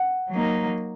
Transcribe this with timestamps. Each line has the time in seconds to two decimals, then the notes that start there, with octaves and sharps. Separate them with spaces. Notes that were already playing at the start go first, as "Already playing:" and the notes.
Already playing: F#5
0.30 F#3 A#3 D#4